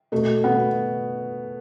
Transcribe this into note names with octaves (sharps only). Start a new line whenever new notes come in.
B2 A3
B2 B3